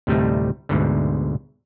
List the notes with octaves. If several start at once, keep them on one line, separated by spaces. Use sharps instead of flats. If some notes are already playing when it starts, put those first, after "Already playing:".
D2 A2 C3 G3 A3 D#4
D2 G#2 B2 D3